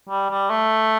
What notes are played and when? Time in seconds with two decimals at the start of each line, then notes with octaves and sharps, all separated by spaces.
0.09 G3
0.30 G3
0.50 A3